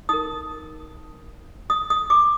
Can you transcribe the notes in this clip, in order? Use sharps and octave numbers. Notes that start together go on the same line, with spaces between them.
D#4 A#4 D#6
D#6
D#6
D6